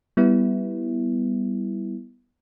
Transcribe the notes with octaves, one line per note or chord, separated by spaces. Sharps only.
G3 B3 E4